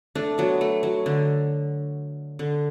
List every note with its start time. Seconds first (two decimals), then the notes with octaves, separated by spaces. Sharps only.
0.15 A3 D4
0.38 F#3 B3
0.61 A3
0.83 F#3
1.06 D3
2.39 D3